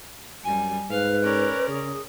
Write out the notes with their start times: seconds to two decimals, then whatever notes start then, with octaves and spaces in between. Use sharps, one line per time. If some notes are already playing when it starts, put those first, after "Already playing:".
0.44 F#2 G3 G#5
0.90 G#2 B4 F5
1.23 C#4 A#4 D5
1.68 C#3 G#4